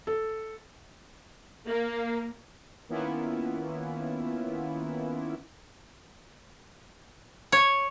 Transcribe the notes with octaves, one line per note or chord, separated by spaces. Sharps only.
A4
A#3
D#3 A#3 B3 C#4 E4 F4
C#5